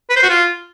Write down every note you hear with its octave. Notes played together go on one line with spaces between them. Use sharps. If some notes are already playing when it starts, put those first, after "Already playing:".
B4
C5
F#4
F4